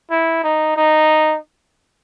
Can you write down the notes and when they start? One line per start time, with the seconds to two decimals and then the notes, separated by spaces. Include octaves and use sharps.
0.10 E4
0.43 D#4
0.76 D#4